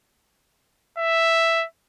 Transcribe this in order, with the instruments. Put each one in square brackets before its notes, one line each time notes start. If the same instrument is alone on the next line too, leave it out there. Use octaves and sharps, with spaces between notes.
[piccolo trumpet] E5